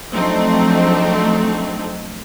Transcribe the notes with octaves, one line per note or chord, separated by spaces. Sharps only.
F3 F#3 A3 C4 D4 D#4